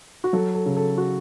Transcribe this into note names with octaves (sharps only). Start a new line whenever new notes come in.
F#4
F#3 A4
A4
C#3
A4
F#4